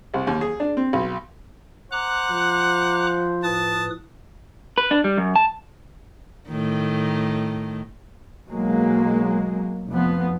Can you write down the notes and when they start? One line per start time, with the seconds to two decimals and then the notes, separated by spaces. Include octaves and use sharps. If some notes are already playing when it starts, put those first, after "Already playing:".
0.14 C2
0.27 D#2
0.41 G#4
0.60 D4
0.77 C4
0.93 B1
1.92 C5 F#5 A#5 D6 F#6
2.30 F3
3.43 A2 B4 A5 D#6
4.78 B4
4.91 D4
5.04 G3
5.17 F#2
5.36 A5
6.48 A2 D#3
8.47 B1 F#3 G#3 A#3
9.88 F1 F3 B3